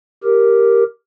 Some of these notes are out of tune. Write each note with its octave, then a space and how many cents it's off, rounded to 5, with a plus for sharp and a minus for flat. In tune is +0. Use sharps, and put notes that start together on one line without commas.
G4 +0 A#4 +0